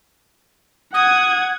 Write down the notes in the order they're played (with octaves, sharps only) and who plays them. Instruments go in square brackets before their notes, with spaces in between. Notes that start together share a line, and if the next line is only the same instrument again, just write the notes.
[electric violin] F#5 G#6 [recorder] D#6